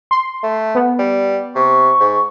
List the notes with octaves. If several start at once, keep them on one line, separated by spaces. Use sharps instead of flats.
C6
A3
B3
G3
C3 C#6
G#2